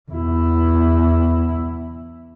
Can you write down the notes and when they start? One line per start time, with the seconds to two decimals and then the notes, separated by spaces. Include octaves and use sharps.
0.11 E2 E4